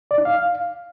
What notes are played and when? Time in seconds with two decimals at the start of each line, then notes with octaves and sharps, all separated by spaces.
0.11 D5
0.18 D#4
0.25 F5